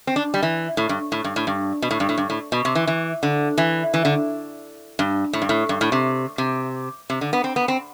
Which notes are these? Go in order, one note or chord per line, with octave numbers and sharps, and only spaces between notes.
C4
D4
G3
E3
A2
G2
A2
G2
A2
G2
B2
A2
G2
A2
G2
A2
B2
C3
E3
E3
D3
E3
E3
D3
G2
A2
G2
A2
G2
A2
C3
C3
C3
D3
B3
C4
B3
C4